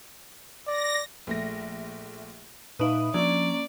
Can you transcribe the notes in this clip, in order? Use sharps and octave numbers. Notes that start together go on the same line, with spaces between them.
D5 A#6
A#1 A3 A#6
A#2 D#4 B4 E5 F5 D#6
F3 A#3 C#4 D4 D5